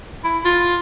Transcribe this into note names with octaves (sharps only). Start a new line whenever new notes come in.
E4
F4